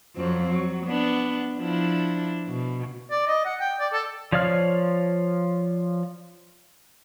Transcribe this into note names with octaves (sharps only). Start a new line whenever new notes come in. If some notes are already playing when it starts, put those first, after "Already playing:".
F2 F#3 C4
F#3
B3 D4
F3 D4 E4
B2
D5
D#5
F#5
G5
D5
A4
F3 C#5 D5 F5 F6